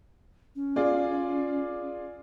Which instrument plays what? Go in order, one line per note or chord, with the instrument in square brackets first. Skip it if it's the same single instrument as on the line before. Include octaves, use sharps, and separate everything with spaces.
[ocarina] C#4
[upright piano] F4 G#4 D5